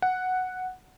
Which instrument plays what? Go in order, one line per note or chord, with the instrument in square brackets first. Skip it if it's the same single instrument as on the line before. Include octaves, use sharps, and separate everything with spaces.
[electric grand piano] F#5